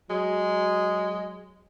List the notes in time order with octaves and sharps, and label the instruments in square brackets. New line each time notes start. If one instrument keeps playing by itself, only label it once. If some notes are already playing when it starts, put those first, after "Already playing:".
[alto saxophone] F#3 [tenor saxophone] G#3